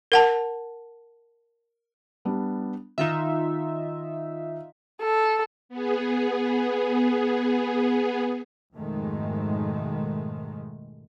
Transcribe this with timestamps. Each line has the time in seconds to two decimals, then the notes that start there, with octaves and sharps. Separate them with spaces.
0.12 A#4 F#5 A5
2.25 G3 B3 D4
2.98 D#3 D#4 F4 E5 E7
5.02 A4
5.69 B3 G#4
8.74 F2 G#2 B2 D#3 G#3 A3